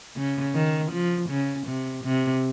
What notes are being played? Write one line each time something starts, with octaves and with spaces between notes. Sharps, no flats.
C#3
D#3
F3
C#3
C3
C3